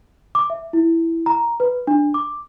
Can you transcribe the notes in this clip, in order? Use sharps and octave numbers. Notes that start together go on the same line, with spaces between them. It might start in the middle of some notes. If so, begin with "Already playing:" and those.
D6
E5
E4
A#5
B4
D4
D6